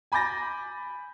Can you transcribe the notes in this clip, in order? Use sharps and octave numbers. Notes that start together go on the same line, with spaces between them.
G#5 B5 D6 G6 A6 A#6